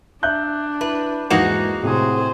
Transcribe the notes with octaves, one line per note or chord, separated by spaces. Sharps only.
D4 E5 F#6 G6
E4 B4
E2 G#2 E3 A#3 D#4 F#4
A2 C3 G#4 C5 D#6